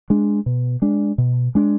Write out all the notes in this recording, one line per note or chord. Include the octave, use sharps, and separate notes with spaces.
G#3 D4
B2
G#3 D4
B2
G#3 D4